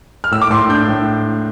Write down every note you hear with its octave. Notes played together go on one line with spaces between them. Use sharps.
F6
A2 E6
D6
A2 C6
D4 G6
A2